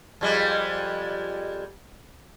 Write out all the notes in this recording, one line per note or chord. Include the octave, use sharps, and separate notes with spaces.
F2 G3 G#3